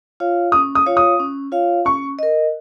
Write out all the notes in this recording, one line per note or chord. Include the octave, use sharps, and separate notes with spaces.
F4 C#5 F5
C#4 D#6
D#6
F4 C#5 F5
D#6
C#4
F4 C#5 F5
C#4 C#6
A#4 D#5